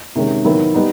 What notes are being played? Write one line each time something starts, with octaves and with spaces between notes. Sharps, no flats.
C3 D#3 G#3 C#4
D#3 F#3 B3 E4
G3 B3 D#4